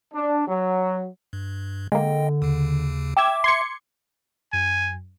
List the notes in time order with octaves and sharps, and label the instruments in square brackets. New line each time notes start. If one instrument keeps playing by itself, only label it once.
[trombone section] D4
F#3
[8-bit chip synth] G2
[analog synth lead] D3 [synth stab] G#3 A#3 [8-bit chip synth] D#5 G5
[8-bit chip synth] D#2 C#3
[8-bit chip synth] E5 [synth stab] G5 E6 G#6 [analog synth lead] D6
[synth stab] C6 G#6 C#7
[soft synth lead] F#2 [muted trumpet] G#5